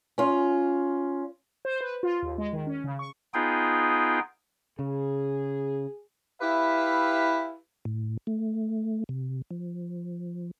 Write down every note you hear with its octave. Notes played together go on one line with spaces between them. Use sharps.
C#4 F4
C5
B4
F4
D#2
G#3
D#3
C#4
C#3
C#6
B3 D#4 F4 G#4 G5
C#3 G#4
E4 G4 B4 E5 F5
A2
A3
C3
F3